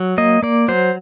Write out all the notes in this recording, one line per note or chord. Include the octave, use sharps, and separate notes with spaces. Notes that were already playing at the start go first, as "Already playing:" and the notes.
Already playing: F#3
A#3 D#5
A#3 D5
F#3 C5